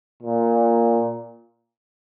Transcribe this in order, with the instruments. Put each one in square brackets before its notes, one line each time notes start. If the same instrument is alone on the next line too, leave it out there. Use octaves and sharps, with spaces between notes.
[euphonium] A#2